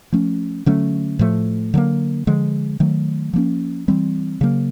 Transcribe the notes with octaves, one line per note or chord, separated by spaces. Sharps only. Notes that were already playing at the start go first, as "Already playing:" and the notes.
F3 A3 C#4
D3 F#3 A3 C#4
A2 F3 A3
D3 F#3 A#3
D3 F3 G#3
D#3 F#3 A3
F3 A#3 C#4
E3 G3 C4
C#3 F#3 A#3